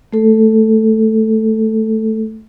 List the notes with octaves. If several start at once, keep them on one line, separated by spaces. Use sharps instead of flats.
A3 A4